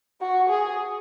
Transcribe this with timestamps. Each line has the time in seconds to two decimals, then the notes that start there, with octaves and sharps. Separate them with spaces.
0.21 F#4
0.49 G#4